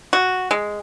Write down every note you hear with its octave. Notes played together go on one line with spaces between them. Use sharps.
F#4
G#3